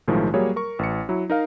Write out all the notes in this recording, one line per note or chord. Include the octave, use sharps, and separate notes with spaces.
B1 A2 D#3 F3 G#3
F#3 G3 A#3 G#4 C#5
A#4 C#6
A1 C#7
F#3 E4
D#4 A#4 F5